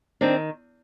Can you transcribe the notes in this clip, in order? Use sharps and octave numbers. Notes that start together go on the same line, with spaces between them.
D#3 C4 D4